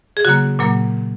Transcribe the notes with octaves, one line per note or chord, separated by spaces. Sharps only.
G#4
C#3 F#3 A#3 F#4
A#2 F#3 A#3